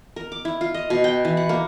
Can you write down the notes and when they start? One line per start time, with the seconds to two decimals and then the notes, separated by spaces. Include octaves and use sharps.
0.16 A#4
0.32 D6
0.45 E4
0.61 F4
0.74 D#5
0.90 B2
1.04 G5
1.25 E3
1.37 F#5
1.49 A#3